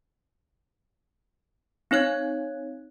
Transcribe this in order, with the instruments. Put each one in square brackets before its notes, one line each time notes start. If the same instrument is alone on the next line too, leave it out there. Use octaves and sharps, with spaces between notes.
[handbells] C4 D#4 C#5 F#6 G#6